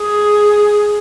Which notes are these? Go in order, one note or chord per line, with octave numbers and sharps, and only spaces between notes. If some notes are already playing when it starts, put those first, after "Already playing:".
Already playing: G#4